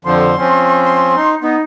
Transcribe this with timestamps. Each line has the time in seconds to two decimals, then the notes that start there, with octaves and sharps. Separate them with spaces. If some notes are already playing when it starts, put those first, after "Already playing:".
0.05 F2 D3 F3 C6
0.39 F3 C4 C#4
0.84 C6
1.16 D#4
1.42 B3 D#4